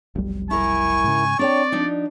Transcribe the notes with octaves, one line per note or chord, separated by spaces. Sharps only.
F1 B1 G3
E4 A#4 G#5 C#6
G#2 C#3
C4 D4 C#5 D5 G5
F3 D4 D#4